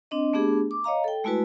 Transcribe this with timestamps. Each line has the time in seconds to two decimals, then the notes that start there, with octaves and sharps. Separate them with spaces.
0.11 C4 D4 D#5
0.33 A3 B3 D4 G4 G#4
0.71 D6
0.84 C#5 D#5 F5 A#5
1.04 A4 G5
1.24 G#3 A3 E4 F#4 B4